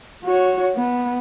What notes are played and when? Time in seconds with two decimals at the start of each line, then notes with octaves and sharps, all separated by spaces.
0.24 F#4 C#5
0.76 B3